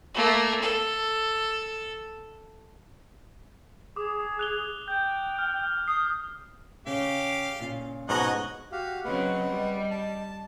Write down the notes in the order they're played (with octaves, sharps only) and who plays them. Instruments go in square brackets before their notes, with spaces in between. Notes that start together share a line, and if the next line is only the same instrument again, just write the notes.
[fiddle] A3 A#3
A4
[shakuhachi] G#4 [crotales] D6 D#6
[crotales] F#6 F7 G7
[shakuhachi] G5 [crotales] G6
[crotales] F6
[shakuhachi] D#6 [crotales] C7
[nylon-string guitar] C#3 [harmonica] G4 F5
[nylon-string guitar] A#2 C#3 F4
[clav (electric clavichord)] G#2 B2 A#5 [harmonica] C#5 D#5 F#5
[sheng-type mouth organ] F#4 G4 F5
[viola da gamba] C#3 F#3 C4 [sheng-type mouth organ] B4 F#5 [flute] D#5
[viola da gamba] G3
[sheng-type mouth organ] A5